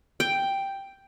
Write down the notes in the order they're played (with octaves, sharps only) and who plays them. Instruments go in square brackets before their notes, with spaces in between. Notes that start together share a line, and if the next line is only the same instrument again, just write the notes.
[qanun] G5